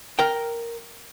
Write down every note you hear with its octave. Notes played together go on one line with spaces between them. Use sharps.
A#4 G5